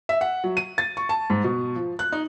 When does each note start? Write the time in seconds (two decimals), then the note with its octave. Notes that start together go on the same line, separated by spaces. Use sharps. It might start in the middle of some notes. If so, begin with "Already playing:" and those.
0.09 E5
0.21 F#5
0.44 F#3
0.57 D#7
0.78 A6
0.97 C#6
1.09 A5
1.30 G#2
1.44 B2
1.75 F3
1.99 F#6
2.12 D#4